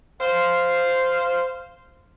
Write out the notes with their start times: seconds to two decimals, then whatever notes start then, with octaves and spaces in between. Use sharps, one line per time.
0.21 C5 F5